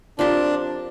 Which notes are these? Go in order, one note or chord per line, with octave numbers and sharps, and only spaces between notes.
F3 C4 D4 G4 A#4